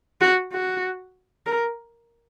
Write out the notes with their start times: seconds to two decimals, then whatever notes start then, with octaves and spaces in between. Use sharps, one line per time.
0.21 F#4
0.53 F#4
1.47 A#4